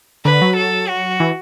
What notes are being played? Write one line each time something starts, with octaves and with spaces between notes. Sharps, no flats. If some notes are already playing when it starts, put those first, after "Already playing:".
D3 B4
F#3
A4
F#4
E3